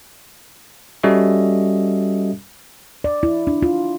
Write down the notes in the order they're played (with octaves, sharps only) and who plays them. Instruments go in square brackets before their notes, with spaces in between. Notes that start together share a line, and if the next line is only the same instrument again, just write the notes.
[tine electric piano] G3 C#4 F#4 A4 D#5 E5
[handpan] D5
E4
D4
F4